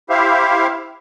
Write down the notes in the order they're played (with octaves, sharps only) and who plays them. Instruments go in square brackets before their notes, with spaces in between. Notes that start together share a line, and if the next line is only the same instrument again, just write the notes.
[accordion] E4 G4 C5 E5 F5